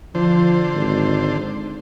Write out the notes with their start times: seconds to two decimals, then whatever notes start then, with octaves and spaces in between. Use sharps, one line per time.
0.15 D3 F3 C5
0.75 G#1